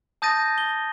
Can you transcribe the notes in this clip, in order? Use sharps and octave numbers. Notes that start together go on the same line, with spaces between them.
A5 D#6 G6 A6 A#6 D#7
G7